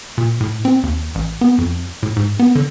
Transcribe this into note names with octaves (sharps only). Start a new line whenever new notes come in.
A#2
A2
C4
D#2
A1
B3
F2
A2
G#2
B3
D3